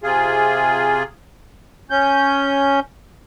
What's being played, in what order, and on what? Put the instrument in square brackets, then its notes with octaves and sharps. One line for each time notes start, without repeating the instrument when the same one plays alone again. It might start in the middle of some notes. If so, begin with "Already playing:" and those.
[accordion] C3 F4 G#4
C#4 G6